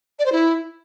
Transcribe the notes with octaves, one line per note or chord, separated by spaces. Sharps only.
D5
C5
E4